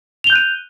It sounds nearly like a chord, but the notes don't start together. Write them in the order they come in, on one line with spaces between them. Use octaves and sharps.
F7 G7 G6 F#6 D#7